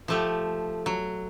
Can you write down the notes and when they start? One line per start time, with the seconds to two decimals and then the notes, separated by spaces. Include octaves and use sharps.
0.08 F3 A3 G4
0.86 F#3